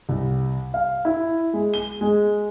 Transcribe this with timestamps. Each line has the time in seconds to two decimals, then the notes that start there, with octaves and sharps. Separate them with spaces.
0.09 C2
0.74 F5
1.05 E4
1.53 G#3
1.74 G7
2.01 G#3